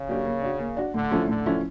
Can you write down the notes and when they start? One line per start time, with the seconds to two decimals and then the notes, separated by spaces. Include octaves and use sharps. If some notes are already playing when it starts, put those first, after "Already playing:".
Already playing: C#3
0.09 F#3 A#3 D4 G4
0.25 A#3
0.42 D4 F#4
0.60 A#3
0.77 D4 F#4
0.94 A2 D3
1.11 F3 A3 C#4 E4
1.28 A2 D3
1.46 F3 A3 C#4 E4